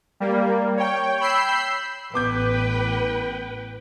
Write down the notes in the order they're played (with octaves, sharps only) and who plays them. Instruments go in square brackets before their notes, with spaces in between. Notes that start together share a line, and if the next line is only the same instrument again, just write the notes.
[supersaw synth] G3 A#3
C#5 G5
B5 E6 G6 C7
[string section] A1 [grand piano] B3 D6 G6 [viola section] B4 G5